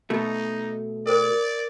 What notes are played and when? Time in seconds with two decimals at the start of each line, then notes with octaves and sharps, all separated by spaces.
0.10 B2 A3 D#4
1.07 A#4 C5 D5